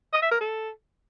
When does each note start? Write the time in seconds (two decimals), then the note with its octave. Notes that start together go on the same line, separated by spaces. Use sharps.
0.13 D#5
0.22 E5
0.31 A#4
0.41 A4